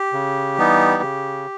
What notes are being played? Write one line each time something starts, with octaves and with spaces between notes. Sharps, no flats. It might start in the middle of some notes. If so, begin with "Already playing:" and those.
Already playing: G4
C#3
E3 G3 B3 D#4
C#3